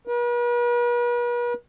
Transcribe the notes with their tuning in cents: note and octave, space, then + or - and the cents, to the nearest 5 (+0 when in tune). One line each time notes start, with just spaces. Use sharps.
B4 -45